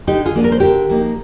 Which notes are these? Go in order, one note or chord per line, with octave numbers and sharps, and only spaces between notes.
D3 D#4 G4
F4 G#4
F3 A#3 D4
A#4
C5
D3 G4 A#4
F3 A#3 D#4